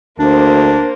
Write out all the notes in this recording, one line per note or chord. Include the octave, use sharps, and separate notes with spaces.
D2 A#3 D4 C5